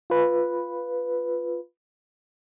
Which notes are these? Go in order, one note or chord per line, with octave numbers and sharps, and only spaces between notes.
F4 B4